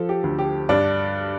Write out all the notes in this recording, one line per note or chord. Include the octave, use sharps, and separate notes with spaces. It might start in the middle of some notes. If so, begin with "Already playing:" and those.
Already playing: F3 A4
G4
D2
G4
G2 D4